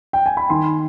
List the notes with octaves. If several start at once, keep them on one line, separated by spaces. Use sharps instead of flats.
G5
G#5
B5
D#3 G#5 C6